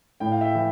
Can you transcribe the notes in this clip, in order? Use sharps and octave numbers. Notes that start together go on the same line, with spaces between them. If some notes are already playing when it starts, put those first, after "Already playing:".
A2 G5
F5
E5 G5
E3